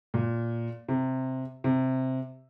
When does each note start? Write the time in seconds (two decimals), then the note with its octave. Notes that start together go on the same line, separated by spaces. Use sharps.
0.14 A#2
0.88 C3
1.64 C3